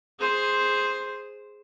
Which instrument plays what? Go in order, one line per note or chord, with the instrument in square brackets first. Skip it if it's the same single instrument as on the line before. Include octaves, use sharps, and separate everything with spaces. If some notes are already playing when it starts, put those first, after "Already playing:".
[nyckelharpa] G#4 C5